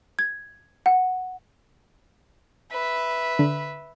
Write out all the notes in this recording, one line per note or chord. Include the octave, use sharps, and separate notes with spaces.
G#6
F#5
B4 E5
D3